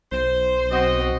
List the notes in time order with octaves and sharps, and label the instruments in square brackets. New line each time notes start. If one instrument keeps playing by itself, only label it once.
[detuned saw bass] B1 [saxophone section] C5
[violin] C4 [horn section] F#4 D#5